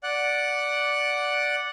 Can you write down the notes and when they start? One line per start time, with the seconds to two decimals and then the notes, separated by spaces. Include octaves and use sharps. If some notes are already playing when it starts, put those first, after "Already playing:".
0.03 D5 F#5 F#6